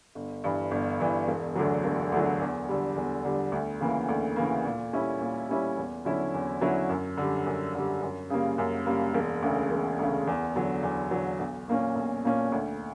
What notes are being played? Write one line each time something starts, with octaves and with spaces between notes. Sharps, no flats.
G1
G2 E3
G1
G2 E3
E1
D2 D3 F#3
E1
D2 D3 F#3
E2
D3 G3
E2
D3 G3
D2
C#3 E3 A#3
D2
C#3 E3 A#3
A#2
G3 C#4 E4
A#2
G3 C#4 E4
E2
D3 F#3 C#4 E4
E2
D3 F#3 C#4 E4
F#2
D3 G3
F#2
D3 G3
F#2
C#3 G3 A#3
F#2
C#3 G3 A#3
E1
D2 C#3
E1
D2 C#3
E2
D3 F#3
E2
D3 F#3
B1
A#2 A#3 C#4
B1
A#2 A#3 C#4
D2